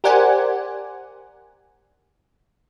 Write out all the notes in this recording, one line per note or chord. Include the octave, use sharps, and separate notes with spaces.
G4 A#4 C5 D5 F#5 G#5